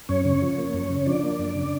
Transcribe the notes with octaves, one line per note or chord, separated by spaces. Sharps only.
F#2 C#4 C#5
C#3 C#4 C#5
F3
A#3
F#2
C#3
F3 D4 D5
A#3
F#2
C#3